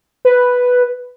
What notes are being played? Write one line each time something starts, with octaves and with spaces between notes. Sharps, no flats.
B4